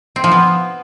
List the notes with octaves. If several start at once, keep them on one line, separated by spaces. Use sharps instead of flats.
C4
F3
B3